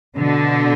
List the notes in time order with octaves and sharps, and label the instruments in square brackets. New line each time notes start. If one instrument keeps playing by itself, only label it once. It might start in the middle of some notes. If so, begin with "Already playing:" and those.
[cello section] B2 D3